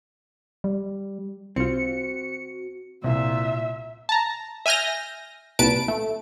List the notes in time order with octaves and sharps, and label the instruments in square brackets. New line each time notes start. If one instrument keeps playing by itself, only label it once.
[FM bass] G3
[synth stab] C2 F4 [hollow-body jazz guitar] C4 [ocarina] F#4 [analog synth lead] C#7
[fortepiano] C2 [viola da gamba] A#2 [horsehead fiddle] E5
[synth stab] A5 A#5
E5 G#5 F6 G6 A#6
C2 A#2 B4 A5 D7
A3